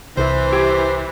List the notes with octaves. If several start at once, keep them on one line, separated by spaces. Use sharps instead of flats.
C2 E3 C5
G4 G#6 D7